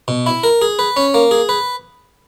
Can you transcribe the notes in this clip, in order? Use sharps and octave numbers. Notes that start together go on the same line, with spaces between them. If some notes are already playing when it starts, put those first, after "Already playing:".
B2
E4
A#4
G#4
B4
C#4
A#3
G#4
B4